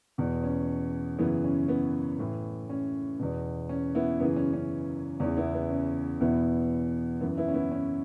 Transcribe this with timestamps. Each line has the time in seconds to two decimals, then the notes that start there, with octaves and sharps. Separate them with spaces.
0.18 E2 B2
0.43 C#4
1.19 F#2 C#3 E3 B3
1.44 C#4
1.68 B3
2.19 A2 E3
2.70 C#4
3.19 E2 B2
3.69 C#4
3.95 B3 E4
4.20 F#2 C#3 E3 B3
4.36 C#4
4.53 C#4
5.20 E2 C#3 E3 C#4
5.37 B3 E4
5.54 B3
5.70 C#4
6.21 E2 B2 B3 E4
7.21 F#2 E3 B3
7.37 B3 E4
7.48 C#4
7.54 B3 E4
7.72 C#4